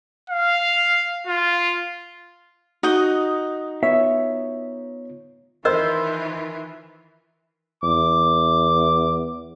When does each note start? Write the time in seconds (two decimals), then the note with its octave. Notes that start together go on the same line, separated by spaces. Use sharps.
0.30 F5
1.27 F4
2.83 D#4 F#4 D#5 D#6 G6
3.83 B3 F4 C#5 E5
5.65 D#3 E3 F4 A#4 C5 D#5 E6
7.83 E2 D6